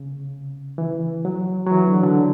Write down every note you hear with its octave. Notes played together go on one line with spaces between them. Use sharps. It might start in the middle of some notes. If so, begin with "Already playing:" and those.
Already playing: C#3
E3
F#3
F#3
E3
D3
D3